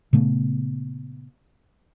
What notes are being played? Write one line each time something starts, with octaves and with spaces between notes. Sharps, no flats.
A#2 C#3 A3 B3